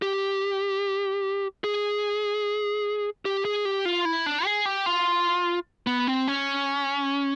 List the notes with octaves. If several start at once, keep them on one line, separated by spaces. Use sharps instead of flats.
G4
G#4
G4
G#4
G4
F4
E4
D4
G#4
G4
F4
B3
C4
C#4